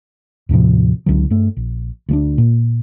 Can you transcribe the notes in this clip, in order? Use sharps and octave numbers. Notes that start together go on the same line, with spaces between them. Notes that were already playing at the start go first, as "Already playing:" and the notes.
D#2 A2 C3 F3
C#2 D3 F#3
G2 A3
A#1
D2 G3 D4
A#2